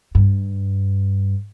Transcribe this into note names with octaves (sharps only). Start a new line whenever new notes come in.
G2